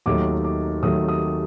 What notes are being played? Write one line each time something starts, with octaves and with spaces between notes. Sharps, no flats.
D#2 D#3 F#3 A3 D6
D6
D#2 D#3 F#3 A3 D#6
D#6